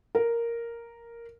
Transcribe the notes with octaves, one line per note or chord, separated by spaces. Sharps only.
A#4